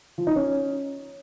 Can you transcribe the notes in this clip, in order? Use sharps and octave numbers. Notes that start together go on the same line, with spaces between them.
F3
D#4
C#4